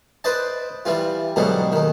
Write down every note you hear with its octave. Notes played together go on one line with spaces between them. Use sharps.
B4 C5 D5 D#5 A5
E3 G3 F4
G#2 B2 D3 F#3 G3
D#2 D#3